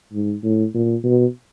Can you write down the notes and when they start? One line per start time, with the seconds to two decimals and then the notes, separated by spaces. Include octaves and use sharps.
0.13 G#2
0.43 A2
0.74 A#2
1.04 B2